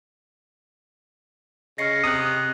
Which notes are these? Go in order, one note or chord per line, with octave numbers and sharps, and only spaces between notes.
C#3 D#5 C#6 F6 A#6 C7 C#7
C3 D#6 F#6